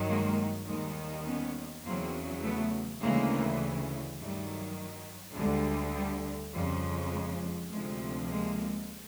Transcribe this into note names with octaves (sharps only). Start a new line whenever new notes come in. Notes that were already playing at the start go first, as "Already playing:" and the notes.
Already playing: G2 D#3 F#3
G#3 A#3
D#2 D#3 G3 G#3
B3 C#4
E2 C#3 F#3 A#3 C4
A3 B3
D2 C#3 E3 G#3 A#3
G2 D#3 F#3 G3 A3
D2 D3 G3 G#3
G3
F2 C#3 F3 G3
G#3
D2 C3 F3 G#3
G#3 A#3